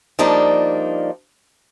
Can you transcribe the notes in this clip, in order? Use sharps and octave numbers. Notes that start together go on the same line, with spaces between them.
F3 G3 A#3 D4 D#4